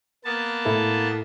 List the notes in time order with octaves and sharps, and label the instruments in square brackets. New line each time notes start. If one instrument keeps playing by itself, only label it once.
[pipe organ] A#3 B3 A5
[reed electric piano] A2 E4 A4